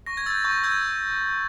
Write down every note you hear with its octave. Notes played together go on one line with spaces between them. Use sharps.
C#6 A#6
G#6
E6 G6 A6
C#6 G6
E6 G6 G#6